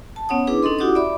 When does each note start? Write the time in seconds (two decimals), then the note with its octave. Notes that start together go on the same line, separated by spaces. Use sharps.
0.16 A5
0.29 B3 C#4 C#5 F#5 D#6
0.47 D4 E4 G#4 B4 D6
0.63 C#4 D#4 A4 D#5 C6
0.79 E4 F#4 G4 F#5 D6 D#6
0.95 D5 E5 B5 D6